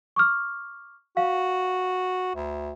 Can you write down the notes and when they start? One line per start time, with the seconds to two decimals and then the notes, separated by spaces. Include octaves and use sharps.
0.16 C#6 D6 F6
1.17 F#4 F5
2.35 D2